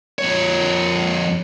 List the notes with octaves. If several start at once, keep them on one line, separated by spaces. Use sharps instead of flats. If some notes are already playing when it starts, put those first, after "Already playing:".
F2 C#5